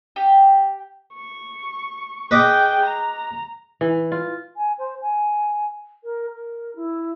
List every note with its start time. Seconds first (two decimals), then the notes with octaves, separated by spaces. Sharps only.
0.16 G4
1.14 C#6
2.31 G#4 B4 D#5 G5 D6
2.85 A#5
3.81 E3
4.12 F4
4.57 G#5
4.78 C5
5.02 G#5
6.04 A#4
6.34 A#4
6.76 E4